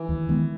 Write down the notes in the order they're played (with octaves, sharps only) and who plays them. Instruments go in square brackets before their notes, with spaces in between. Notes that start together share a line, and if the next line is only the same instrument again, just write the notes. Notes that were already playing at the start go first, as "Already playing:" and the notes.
Already playing: [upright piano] E3
[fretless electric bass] D#2
D#3 G#3 B3